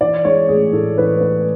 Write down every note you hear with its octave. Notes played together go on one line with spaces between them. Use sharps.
E3 D5
G#3 C#5
A1 G#4
A2 A4
E3 B4
G#3 B4